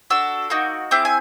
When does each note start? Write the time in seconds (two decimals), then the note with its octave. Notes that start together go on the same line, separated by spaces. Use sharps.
0.10 D4 F#4 A4 E6
0.50 A#3 D#4 F#4
0.91 C4 E4 G#4 D6
1.05 G#5